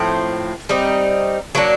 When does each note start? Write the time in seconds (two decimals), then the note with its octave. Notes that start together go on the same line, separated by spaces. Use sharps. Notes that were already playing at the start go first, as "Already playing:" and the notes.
Already playing: A2 F3 C4
0.69 G3 C4 D#4
1.55 F#3 A#3 D4